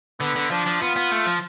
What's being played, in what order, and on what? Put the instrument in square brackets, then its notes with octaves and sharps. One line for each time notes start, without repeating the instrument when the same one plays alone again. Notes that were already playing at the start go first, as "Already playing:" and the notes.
[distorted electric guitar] D3 [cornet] B3
[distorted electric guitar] D3
[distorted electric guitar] F3 [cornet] D4
[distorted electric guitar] F3
[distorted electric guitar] B3 [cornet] F4
[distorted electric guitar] B3
A3
F3